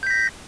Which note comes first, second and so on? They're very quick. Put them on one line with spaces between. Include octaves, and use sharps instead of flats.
G6 B6 A#6